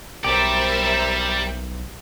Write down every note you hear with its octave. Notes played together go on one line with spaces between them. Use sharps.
B1 G3 G4 A#4 C5 D5 E5